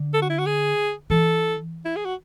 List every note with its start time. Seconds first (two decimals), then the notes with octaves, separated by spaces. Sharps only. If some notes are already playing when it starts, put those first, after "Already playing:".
Already playing: D3
0.14 A4
0.22 F#4
0.30 E4
0.38 F#4
0.46 G#4
1.10 E3 A4
1.85 E4
1.96 G#4
2.05 F#4